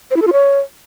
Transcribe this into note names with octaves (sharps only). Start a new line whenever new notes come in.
C5
E4
A4
F4
C#5